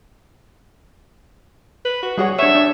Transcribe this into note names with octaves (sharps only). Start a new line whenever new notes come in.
B4
F#4
G3 F#4 G#4 C#5
D4 C#5 E5
D4